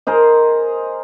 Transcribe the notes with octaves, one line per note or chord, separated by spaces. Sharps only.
G#4 A#4 C5 D#5